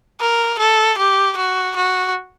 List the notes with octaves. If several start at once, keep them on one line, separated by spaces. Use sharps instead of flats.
A#4
A4
G4
F#4
F#4